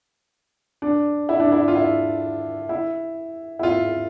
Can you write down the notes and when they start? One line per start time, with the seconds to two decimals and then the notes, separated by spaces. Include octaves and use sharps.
0.82 D4
1.29 E4
1.40 D4
1.52 E4
1.68 F4
1.76 E4
2.69 E4
3.59 E4
3.63 F4